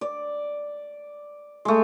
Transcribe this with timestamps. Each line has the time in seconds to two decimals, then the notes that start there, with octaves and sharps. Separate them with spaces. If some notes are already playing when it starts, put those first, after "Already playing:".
0.01 D5
1.65 G#3 A3